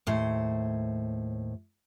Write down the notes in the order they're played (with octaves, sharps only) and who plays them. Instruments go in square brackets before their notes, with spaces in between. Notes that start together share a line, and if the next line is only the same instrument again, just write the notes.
[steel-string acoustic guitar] D#2 A2 C5